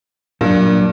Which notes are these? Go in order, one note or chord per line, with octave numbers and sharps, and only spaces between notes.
G2 A#2 F#3 D4 D5